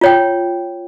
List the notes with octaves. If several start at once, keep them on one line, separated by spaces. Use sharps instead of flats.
F4 C#5 G5